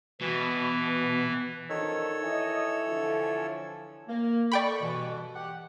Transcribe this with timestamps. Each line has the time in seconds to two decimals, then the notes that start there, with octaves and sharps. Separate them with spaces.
0.21 B2 E3
1.70 F#2 D#3 F3 D4 A4 C#5 E6
2.22 E3 D#5
2.89 D3 F3
4.09 A#3
4.52 A4 D5 G5 B5 C#6
4.82 G2 B2 E3
5.35 G4 F#5